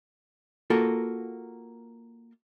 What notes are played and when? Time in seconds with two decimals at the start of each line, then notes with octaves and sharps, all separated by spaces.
0.70 A#3 F4 F#4 A4 A#4